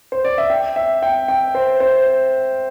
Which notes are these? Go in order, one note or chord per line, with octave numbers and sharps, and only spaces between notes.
C5
D5
E5
G5
E5
G5
G5
C5
C5